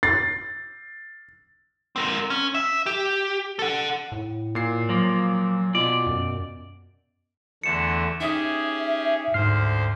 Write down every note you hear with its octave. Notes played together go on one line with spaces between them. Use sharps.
A6 C7
C4 A#4
C#4
E5
G4
A4 F#5
A2
A#2 C7
F3 F#3 A#3
B2 F4 D5
F#2
E2 D3 A3 C#7 E7
C#4 D#4 G4 G#4 E5 D#6
D2 G#2 C5 F6 C7